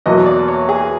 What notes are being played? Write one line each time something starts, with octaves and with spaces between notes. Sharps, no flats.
E2 B2 F#3 A#3 D#5
D5
C#5
G#4